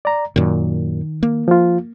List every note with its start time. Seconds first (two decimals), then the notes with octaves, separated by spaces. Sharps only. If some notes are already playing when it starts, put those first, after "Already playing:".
0.05 D5 A#5
0.36 F#2 A#2 D#3
1.23 A#3
1.48 F3 F4